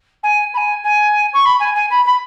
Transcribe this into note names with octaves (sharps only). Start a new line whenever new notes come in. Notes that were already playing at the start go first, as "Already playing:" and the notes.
G#5
B5
G#5
G#5
C#6
B5
G#5
G#5
B5
B5